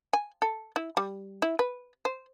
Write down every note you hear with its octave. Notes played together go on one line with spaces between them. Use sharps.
G#5
A4
E4
G3
E4
B4
C5